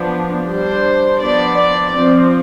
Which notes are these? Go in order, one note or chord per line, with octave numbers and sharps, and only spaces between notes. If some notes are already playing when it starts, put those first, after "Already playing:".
Already playing: F3 B3 D4
G3 D4 C5
F3 B3 D4 D5
D5
F3 C4